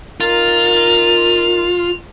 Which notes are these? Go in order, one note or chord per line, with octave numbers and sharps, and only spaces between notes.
D#4 F4 A#4 F7